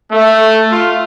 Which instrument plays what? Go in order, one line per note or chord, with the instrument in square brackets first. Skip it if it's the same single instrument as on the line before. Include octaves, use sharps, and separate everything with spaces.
[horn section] A3
F4